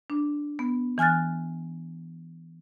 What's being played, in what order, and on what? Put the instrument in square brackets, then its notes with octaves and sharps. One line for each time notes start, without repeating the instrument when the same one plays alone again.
[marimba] D4
B3
E3 G#5 F6 F#6 A6